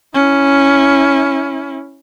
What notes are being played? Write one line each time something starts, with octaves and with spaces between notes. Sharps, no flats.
C#4 E4